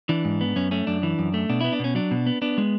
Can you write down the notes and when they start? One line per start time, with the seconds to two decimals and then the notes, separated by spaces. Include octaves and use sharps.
0.09 E3 D4
0.25 G#2
0.41 B3
0.56 F#2 C#4
0.71 A3 C#4
0.87 F#2 D4
1.03 E3
1.19 F#2
1.34 A3
1.49 B2 D4
1.61 B3 E4
1.72 D4
1.79 B2 C#4
1.95 F#3 D4
2.11 B2
2.26 B3
2.42 B3 D4
2.58 G#3